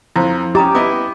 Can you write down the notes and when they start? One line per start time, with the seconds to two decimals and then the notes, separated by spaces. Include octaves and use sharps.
0.16 F2 E4 C5
0.55 C#4 G4 D#5 A#5 D6 D#6
0.75 B3 E4 D#5 D6 D#6